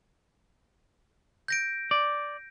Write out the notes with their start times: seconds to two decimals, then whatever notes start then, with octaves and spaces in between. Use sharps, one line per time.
1.48 G6 A#6 D7
1.91 D5